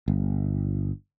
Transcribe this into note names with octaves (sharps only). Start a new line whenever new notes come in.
G1